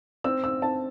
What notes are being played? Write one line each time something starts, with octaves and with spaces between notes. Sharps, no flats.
C4 E6
E6
C4 A5